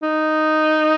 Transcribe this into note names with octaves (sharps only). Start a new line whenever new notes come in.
D#4